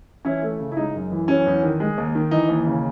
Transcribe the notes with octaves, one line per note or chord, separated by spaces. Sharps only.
E3 C#4 E4
A3
C#3
E4
G#3 D#4
F#2
E3
F#3 C#4
E2
D#3
G#3
D#2
D#3
E3 D#4
D#2
C#3